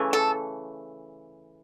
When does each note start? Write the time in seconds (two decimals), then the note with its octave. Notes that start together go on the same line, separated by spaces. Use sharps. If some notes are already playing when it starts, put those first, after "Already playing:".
Already playing: C#3 E3 A3
0.13 A4